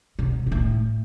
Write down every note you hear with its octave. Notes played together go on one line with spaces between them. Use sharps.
B2
G#2
A2